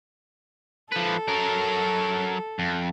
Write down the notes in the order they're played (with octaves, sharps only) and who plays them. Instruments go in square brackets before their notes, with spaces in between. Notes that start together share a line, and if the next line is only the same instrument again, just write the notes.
[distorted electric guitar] F3 B4 [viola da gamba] A4
[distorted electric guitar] F#3 A#4
F2